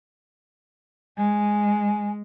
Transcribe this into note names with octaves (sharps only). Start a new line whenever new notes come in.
G#3 G#5